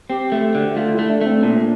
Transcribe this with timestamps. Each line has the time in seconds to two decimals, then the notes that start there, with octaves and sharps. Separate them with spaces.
0.10 C4 G4
0.32 A3
0.55 D3
0.76 A3 F4
0.93 E4
0.99 A3
1.09 D4
1.21 A3 C4
1.43 A#2 D4